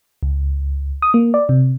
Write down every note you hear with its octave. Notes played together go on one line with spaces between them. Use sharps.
C#2
D#6
A#3
D5
C3